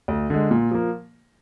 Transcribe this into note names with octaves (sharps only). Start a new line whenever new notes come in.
D2
D3 G#3
A#2
F3 A#3